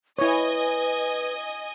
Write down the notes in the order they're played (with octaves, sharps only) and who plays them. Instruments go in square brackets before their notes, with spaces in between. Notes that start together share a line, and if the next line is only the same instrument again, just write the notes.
[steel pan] E4 C#5 [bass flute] B4 [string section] D#5 G#5